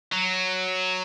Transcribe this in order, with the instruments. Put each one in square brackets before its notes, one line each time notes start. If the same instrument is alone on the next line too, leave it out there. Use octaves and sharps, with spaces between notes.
[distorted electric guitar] F#3